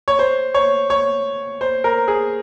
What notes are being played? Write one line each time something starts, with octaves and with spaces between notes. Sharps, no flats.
C#5
C5
C#5
C#5
C5
A#4
G#4